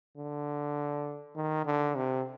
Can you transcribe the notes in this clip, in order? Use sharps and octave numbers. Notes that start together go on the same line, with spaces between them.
D3
D#3
D3
C3